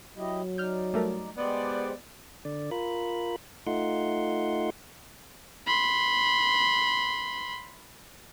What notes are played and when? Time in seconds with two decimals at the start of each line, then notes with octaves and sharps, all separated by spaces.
0.17 F#3 E4 G4 D#5
0.58 D#4 D5 F6 G6
0.94 G3 A3 A#4
1.38 G#3 B3 G4 C5 D5
2.45 D3 D5
2.71 F4 A#4 B5
3.67 A3 D#4 F4 F#5 C6
5.67 B5 C6